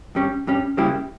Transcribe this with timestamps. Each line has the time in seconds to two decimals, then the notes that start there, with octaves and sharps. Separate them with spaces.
0.15 G2 G3 C#4
0.47 G2 G3 C#4
0.77 C#3 G3 A#3 E4 G4